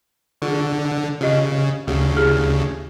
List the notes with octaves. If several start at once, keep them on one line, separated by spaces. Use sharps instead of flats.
D3 F4 G#4
C#3 F4 G4 D#5
D2 C#3 G4
E4 G4 G#4